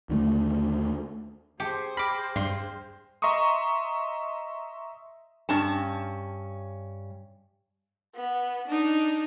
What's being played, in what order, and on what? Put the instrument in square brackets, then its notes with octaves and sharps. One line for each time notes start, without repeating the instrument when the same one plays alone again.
[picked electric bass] D#2 D3 F#3 A3
[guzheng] G4 [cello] G#4 C5 [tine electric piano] A5 C#7
[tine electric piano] G5 F6 A#6 [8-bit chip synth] B5 D6
[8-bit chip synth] G2 [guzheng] C6
[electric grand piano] D#5 E5 A#5 C6 C#6 D#6
[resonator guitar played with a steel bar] G2 C#4 A5
[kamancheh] B3
D4 D#4